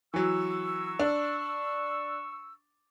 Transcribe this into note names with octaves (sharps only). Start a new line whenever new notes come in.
E3 F#3 C#6 E6
D4